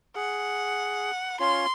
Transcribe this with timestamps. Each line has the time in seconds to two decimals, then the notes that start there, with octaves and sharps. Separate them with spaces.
0.16 G#4 F#5
1.40 C#4 F4 C#5 C6